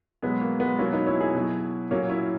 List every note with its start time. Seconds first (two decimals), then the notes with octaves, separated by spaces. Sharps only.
0.22 B2 F#3 G#3 B3
0.41 A#3
0.60 G#3 B3
0.79 B2 F#3 A#3 C#4
0.93 B3 D#4
1.07 C#4 E4
1.20 E4 G#4
1.35 B2 F#3
1.91 A#2 F#3 A#3 C#4
2.09 C#4 E4